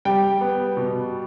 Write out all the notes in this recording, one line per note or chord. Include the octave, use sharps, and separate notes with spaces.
G3 G5
B3
B2